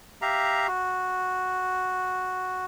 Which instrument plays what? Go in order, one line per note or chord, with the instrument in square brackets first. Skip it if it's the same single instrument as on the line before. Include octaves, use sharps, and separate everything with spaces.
[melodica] G4 E5 F5 A#5
F#4